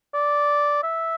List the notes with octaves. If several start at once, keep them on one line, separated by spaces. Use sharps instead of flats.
D5
E5